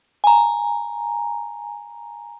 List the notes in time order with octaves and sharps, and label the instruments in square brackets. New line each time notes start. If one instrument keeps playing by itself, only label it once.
[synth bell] G#5 A#5